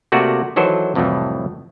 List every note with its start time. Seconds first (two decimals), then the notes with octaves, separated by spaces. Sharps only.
0.12 C3 A3 A#3 F#4 D5
0.56 D#3 E3 F#3 A4 C5
0.95 C2 F2 A2 E3 F#3 A3